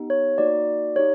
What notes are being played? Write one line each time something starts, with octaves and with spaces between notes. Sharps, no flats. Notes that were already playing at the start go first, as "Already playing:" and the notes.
Already playing: B3 D#4 G4
C#5
A#3 D#4 F#4 D5
D#4 G4 C#5